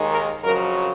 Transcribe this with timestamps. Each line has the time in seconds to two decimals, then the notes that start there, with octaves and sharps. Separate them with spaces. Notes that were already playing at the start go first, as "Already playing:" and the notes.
Already playing: D#2 D#3 G#3
0.11 A#4
0.43 F2 C#3 F#3 A#4